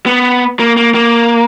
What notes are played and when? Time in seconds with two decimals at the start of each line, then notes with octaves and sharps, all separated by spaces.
0.06 B3
0.60 A#3
0.77 A#3
0.94 A#3